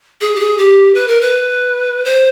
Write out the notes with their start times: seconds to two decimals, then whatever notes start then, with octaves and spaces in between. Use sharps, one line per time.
0.21 G#4
0.36 G4
0.40 G#4
0.58 G4
0.95 B4
1.08 A#4
1.21 B4
2.05 C5